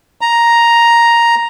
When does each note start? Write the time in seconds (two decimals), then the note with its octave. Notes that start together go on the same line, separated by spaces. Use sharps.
0.21 A#5